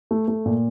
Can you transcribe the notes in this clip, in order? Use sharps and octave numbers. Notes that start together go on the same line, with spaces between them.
A3
A3
A#2